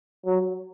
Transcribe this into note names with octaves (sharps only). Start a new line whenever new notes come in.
F#3